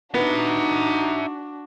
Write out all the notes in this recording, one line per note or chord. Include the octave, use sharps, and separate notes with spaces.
B3 D4 D#4 F#4 E5 A#5